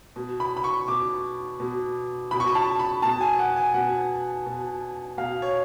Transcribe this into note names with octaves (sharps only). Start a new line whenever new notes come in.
B2
B5
B5
C#6
B2 D6
B2
B2 B5
C#6
B5
A5
B5
B2 A5
G#5
F#5
G#5
B2 F#5
B2
B2 F5
C#5